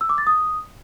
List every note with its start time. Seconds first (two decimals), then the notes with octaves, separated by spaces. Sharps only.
0.01 E6
0.09 D6
0.18 A6
0.27 D#6